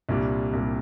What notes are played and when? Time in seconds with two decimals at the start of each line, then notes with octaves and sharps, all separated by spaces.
0.09 C2 A#2 G3 D4
0.53 C2 A#2 G3